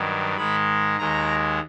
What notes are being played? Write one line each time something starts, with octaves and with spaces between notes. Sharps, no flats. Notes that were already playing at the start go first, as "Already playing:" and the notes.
Already playing: G2 D#3 F#3
G#2 D#3 G#3 B5
D#2 D#3 G#3 A#5